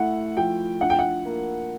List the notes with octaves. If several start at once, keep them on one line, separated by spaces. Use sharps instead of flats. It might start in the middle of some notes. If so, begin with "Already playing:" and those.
Already playing: A3 E4 F#5
F3 G5
D4 F#5
G5
F#5
A#3